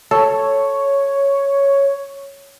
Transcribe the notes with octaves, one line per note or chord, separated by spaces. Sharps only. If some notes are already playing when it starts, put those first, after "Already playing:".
A4 C#5